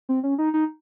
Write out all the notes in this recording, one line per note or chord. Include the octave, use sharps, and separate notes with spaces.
C4
C#4
D#4
D#4